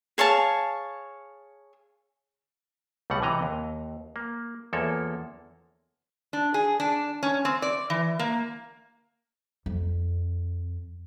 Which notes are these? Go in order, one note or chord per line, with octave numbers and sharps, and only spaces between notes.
G#4 C#5 F5 A5
C#2 B2 G3 F#5
C3 E3 D#5 A#5
D#2
A#3
E2 F3 A#3 A4 C#5
D4
G#4
D4
C#4
C4
D5
E3
A#3
F2